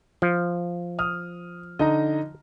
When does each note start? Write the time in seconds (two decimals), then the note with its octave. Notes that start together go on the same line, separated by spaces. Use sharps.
0.22 F3
0.99 D#6 F6
1.79 D3 D#4 D#5 A#5